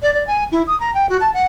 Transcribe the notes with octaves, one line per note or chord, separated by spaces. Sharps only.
D5
D5
G#5
E4
D#6
A#5
G5
F#4
A5
F#5